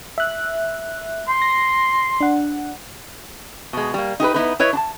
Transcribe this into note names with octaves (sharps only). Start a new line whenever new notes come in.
E5 F#6
C6
A#6
D4 F#5
B2 G#3
G3 A#3
D#4 G4 A#4 B4
B3 D#4 E4 B4
E4 B4 C#5 D#5
D4 A5